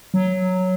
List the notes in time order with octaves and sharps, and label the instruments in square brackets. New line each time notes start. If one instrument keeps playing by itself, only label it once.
[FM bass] F#3